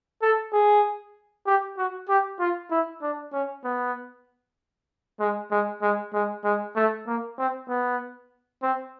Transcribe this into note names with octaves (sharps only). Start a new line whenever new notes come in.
A4
G#4
G4
F#4
G4
F4
E4
D4
C#4
B3
G#3
G#3
G#3
G#3
G#3
A3
A#3
C4
B3
C4